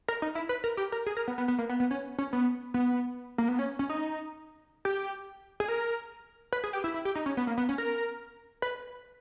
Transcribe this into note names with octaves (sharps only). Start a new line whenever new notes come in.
A#4
D#4
E4
B4
A#4
G4
A#4
G#4
A#4
B3
B3
B3
A#3
B3
B3
C#4
C#4
B3
B3
A#3
B3
C#4
C#4
D#4
G4
G#4
A#4
B4
G#4
G4
E4
E4
G4
D#4
C#4
B3
A#3
B3
C#4
A#4
B4